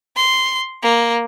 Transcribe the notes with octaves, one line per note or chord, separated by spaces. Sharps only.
C6
A#3